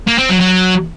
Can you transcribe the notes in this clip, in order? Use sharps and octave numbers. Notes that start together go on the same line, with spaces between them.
A#3
C4
F#3
F#3